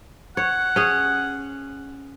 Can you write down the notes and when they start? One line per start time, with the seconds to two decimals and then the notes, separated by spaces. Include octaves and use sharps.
0.37 C#5 F#5
0.76 C#4 G#4